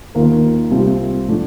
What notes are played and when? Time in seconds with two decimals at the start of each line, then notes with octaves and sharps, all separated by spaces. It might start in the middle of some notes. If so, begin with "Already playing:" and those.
0.15 D#2 D#3 A#3 F4 A#4
0.71 C2 C3 G3 C4 F4
1.28 A2 F3 A3 D4